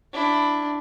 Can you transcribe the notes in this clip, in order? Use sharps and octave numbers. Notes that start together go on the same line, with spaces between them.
D4 E4